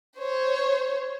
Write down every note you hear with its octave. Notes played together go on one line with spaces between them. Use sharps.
C5 C#5